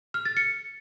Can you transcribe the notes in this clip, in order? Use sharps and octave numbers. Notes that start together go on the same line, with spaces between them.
F6
A6
C#7